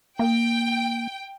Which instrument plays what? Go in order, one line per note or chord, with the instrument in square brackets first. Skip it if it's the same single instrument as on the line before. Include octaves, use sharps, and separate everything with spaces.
[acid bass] A#3 [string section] G5